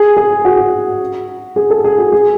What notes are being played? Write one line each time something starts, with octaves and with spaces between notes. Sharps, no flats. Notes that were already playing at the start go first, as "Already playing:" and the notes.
Already playing: G#4
G#4
F#4
G#4
A4
G#4
F#4
G#4